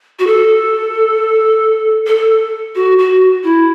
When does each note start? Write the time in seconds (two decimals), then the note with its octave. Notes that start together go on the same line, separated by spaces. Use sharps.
0.19 F#4
0.27 A4
2.07 A4
2.75 F#4
2.98 F#4
3.44 E4